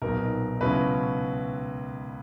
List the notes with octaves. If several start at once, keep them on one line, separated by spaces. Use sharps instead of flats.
B1 A#2 F#3 B3 D#4 A#4
C#2 B2 F#3 C#4 E4 B4